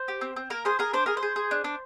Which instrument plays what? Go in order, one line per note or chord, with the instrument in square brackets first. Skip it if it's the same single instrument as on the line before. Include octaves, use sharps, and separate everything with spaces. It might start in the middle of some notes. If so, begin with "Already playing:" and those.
Already playing: [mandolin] C5
G4
C4
C4
A#3 A#4
G#4 C5
G#4 A#4
D4 C5
G#4 A#4
C5
G#4
G#4
D4
D4